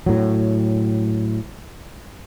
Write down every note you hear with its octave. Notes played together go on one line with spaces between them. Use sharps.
A2 F#3